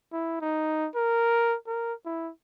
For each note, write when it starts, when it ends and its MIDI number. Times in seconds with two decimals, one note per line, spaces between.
0.13 0.39 64
0.41 0.88 63
0.95 1.56 70
1.67 1.93 70
2.06 2.31 64